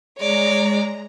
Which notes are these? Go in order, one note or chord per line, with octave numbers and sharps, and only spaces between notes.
G#3 C#5 D5 A#5